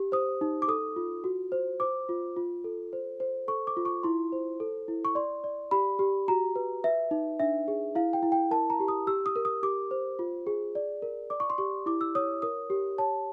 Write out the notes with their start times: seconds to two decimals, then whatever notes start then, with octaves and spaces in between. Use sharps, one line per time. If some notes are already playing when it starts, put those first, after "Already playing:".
Already playing: G4
0.12 C5 D#6
0.41 D#4
0.62 D6
0.68 A4 D#6
0.96 F4
1.24 F#4
1.52 C5
1.80 C5 D6
2.09 F4
2.36 F4
2.64 A4
2.93 C5
3.20 C5
3.48 A4 C#6
3.67 D6
3.77 F4
3.85 C#6
4.03 E4 C6
4.32 C5
4.60 A4
4.88 E4
5.05 C#6
5.15 D5 C6
5.44 D5
5.71 G4 B5
5.99 G4
6.28 F#4 A#5
6.56 B4
6.84 B4 E5
7.11 D#4
7.40 D4 E5
7.68 G#4
7.95 E4 F5
8.13 G5
8.23 E4
8.32 G5
8.51 A#4 A5
8.70 A#5
8.80 G4
8.88 D#6
9.07 G4 E6
9.26 D#6
9.36 A#4
9.45 D#6
9.63 G4 D6
9.91 C5
10.19 F4
10.47 G#4
10.75 D5
11.02 A#4
11.30 D5 D6
11.40 C#6
11.50 C6
11.58 G4 C#6
11.86 E4 D6
12.01 E6
12.15 C#5 D#6
12.42 A#4 D#6
12.70 G4
12.98 C#5 A5